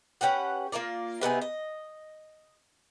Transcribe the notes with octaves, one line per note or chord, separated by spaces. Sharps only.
C#4 G4 B4 F#5
A#3 F4 A#4 D5
C3 B3 D#4 G#4
D#5